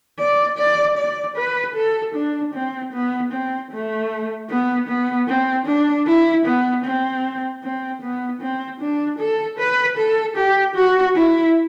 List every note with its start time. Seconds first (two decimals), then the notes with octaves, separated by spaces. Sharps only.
0.19 D5
0.58 D5
0.97 D5
1.37 B4
1.75 A4
2.15 D4
2.54 C4
2.93 B3
3.32 C4
3.71 A3
4.50 B3
4.88 B3
5.28 C4
5.66 D4
6.06 E4
6.46 B3
6.85 C4
7.63 C4
8.02 B3
8.41 C4
8.80 D4
9.19 A4
9.58 B4
9.98 A4
10.36 G4
10.76 F#4
11.15 E4